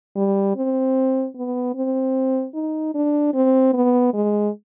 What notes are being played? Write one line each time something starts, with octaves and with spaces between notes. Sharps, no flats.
G3
C4
B3
C4
D#4
D4
C4
B3
G#3